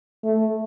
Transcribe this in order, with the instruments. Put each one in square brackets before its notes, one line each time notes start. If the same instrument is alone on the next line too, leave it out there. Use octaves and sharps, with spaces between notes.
[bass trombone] A3